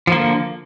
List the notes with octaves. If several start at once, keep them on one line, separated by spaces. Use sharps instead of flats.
D3 F3 A#3